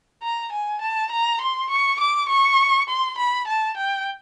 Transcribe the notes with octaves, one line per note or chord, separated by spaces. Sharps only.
A#5
G#5
A5
A#5
C6
C#6
D6
C#6
C6
B5
A5
G5